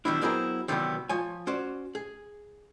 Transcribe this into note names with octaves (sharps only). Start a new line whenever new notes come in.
D#3 F#3 G3 B3 D4 E4
F#3 B3 C4 E4 G#4 A#4
C3 D#3 E3 F#3 G3 B3
F3 C#5 G#5
C#4 F#4 C5 D5
G#4